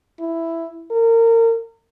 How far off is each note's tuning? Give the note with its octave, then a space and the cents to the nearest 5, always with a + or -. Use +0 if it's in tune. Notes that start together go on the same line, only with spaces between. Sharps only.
E4 +5
A#4 -30